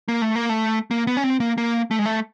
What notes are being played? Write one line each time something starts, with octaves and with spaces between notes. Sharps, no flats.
A#3
A3
A#3
A3
A#3
B3
C#4
C4
A#3
A#3
A3
G#3
A3